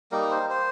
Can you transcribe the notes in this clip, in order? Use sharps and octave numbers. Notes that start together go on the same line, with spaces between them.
G3 A#3 D#4 A#4
C5
C5